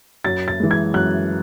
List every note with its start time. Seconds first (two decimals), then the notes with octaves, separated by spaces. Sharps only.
0.24 F#2 A6
0.48 A6
0.60 E3 G#3
0.71 G#6
0.94 F#2 F#6